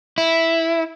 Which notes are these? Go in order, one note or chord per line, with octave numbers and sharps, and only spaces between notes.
E4